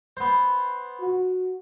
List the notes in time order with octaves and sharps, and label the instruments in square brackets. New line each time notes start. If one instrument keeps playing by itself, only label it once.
[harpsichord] B3 C5
[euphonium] F#4